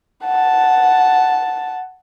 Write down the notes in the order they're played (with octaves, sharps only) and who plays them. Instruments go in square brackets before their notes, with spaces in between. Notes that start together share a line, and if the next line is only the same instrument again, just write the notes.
[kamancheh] F#5 A5